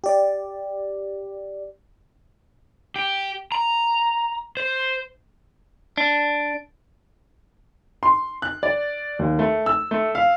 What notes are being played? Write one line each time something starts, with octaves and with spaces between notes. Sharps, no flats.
G4 D5
G4
A#5
C5
D4
C6
F#6
D5
D#2
A3
E6
A3
F5